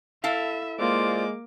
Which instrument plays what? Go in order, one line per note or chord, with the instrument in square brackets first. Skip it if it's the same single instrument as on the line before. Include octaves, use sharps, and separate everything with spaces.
[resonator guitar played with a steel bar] E4 A4 F5 [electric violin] E5
[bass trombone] G#3 [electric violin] A#3 D6 [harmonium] F4 C5 D5